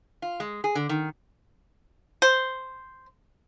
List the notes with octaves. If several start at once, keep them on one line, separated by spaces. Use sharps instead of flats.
F4
G#3
G#4
D3
D#3
C5